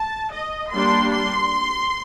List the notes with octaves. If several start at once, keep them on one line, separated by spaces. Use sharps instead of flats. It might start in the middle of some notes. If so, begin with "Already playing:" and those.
Already playing: A5
D#5
G3 A#3 D4 C6
C6